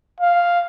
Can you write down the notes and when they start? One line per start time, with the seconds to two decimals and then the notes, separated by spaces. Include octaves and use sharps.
0.20 F5